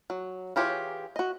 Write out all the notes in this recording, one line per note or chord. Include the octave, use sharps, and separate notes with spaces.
F#3
E3 F4 G4 G#4 C#5
F#4 D#5